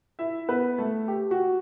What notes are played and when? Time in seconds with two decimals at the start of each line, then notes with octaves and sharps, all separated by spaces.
0.19 E4 E5
0.48 B3 B4
0.78 A3 A4
1.08 G4
1.31 F#4